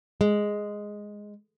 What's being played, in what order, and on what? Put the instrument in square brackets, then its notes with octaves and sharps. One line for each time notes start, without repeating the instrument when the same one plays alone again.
[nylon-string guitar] G#3